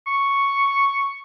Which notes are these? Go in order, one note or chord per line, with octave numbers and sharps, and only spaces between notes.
C#6